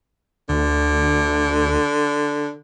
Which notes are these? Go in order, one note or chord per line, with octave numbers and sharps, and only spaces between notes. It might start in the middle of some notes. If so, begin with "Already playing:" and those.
D2 D3